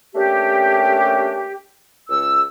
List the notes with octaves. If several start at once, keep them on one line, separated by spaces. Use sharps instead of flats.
A3 A#3 C#4 D4 G4
C#2 E6